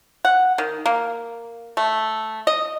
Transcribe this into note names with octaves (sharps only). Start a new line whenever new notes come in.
F#5
D#3
A#3
A3
D#5